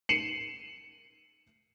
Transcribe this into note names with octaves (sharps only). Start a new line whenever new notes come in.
C7 C#7 D#7 E7 F#7